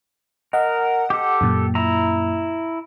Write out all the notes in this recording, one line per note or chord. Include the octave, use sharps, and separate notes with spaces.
A#4 D#5 F#5
G4 A4
F#2 A#2
E4 A#5